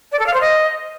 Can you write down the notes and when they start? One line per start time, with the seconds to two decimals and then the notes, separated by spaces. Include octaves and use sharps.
0.12 D5
0.19 A4
0.26 F5
0.33 C5
0.40 D#5